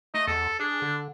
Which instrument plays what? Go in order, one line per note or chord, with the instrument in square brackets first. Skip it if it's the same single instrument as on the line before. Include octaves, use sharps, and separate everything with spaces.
[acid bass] A3 [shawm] D#5
[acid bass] E2 [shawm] A4
[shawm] D4 [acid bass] G#4
[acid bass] D3